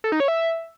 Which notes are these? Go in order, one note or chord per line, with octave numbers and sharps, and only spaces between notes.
A4
D#4
C#5
E5